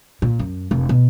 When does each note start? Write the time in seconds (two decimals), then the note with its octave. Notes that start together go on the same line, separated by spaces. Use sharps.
0.22 A#2
0.39 F#2
0.71 F1
0.89 B2